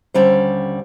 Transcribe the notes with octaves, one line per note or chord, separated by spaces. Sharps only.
D#2 D3 G3 C#4 C5